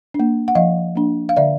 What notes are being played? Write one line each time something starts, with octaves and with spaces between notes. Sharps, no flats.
D4
A#3
F#5
F3 D#5 F5
A#3 D4
F5
D3 D5 E5